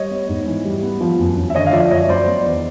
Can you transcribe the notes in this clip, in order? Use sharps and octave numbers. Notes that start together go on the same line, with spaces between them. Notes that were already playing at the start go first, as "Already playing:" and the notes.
Already playing: G3 C#5 D#5
B3
G#2
E3
G3
B3
F3
F#2
F#2
E5
D3 C#5 D#5
F5
F3 D5 E5
F#2 C#5 D#5
F#3 C5 D5
B3
E2